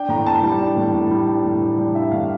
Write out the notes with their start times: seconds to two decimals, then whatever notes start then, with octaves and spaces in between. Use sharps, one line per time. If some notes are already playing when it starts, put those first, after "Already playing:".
Already playing: D4 G5
0.09 A2 A#5
0.26 A2 A5
0.43 G3 G5
0.60 D4
0.77 A2
0.94 A2
1.11 G3
1.28 D4
1.45 A2
1.62 A2
1.78 G3
1.95 D4 E5
2.12 A2 F5